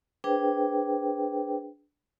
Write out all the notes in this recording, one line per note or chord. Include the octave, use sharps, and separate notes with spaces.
D4 G#4 B4 C5 G5